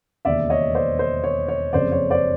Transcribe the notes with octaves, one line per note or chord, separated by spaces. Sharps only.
E1 D#2 C#3 D5 E5
C#5 D#5
C5 D5
C5
C#5
C#5
F#1 F2 C#3 C5 D5
C#5
C5 D5